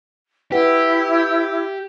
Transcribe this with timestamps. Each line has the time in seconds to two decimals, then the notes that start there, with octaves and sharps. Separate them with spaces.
0.52 E4 G4 B4 F#5